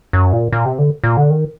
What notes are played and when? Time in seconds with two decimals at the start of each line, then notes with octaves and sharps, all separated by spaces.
0.13 F#2
0.33 A#2
0.52 A#2
0.65 C3
0.79 D3
1.04 A#2
1.17 D3
1.30 D#3